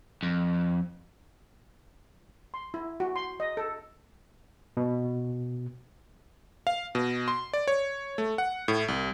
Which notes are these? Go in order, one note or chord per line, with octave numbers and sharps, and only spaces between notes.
F2
C6
E4
F#4
C6
D#5
A4
B2
F5
B2
C6
D5
C#5
A3
F#5
A2
C2